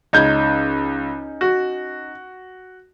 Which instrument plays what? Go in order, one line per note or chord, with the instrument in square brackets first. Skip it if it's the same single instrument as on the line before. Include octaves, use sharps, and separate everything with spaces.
[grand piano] C#2 G6 [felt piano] C#4 D#4 G#6
[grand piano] F#4